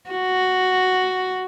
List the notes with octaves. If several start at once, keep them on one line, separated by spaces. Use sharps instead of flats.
F#4